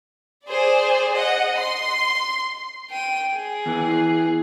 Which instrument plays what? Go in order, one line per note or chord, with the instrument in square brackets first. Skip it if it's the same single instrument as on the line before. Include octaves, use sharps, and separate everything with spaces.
[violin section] G#4 C5 D5
D#5 F#5
C6
[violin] G5 D#7
G#4
[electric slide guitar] E2 E3